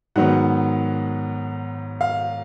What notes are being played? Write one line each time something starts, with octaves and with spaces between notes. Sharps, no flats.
G#2 D#3 F#3 B3 F#5
F5